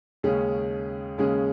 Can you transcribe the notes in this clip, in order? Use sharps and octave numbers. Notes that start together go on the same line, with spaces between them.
D#2 C#3 G#3 C#4 G#4
D#2 C#3 G#3 C#4 G#4